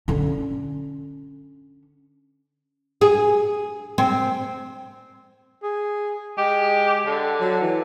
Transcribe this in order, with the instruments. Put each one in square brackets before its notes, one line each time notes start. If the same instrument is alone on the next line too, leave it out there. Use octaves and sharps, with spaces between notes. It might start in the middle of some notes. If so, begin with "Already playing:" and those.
[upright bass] D3 C#4
[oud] G#4
C4
[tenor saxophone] G#4
[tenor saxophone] G#3 [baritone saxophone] G4
[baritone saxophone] D3
[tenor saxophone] F#3
E3